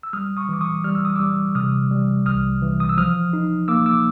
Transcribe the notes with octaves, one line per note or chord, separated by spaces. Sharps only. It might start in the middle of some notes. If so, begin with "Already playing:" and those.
E6
G3 D#6 F6
C#6 D#6
E3 D6
C#6 D#6
G3 F6
E6
D#6
G3 D6 E6
C3 D#6 F6
G3
C2 D#6 F6
E3
D#6
E6
F3 D#6 F6
D#4
A#3 D6 E6
D6 E6